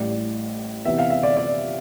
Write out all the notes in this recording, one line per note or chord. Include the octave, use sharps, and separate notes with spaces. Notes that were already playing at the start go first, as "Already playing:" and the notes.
Already playing: A1 A2 G3 D5
C3 E3 B3 E5
F5
E5
D5
D5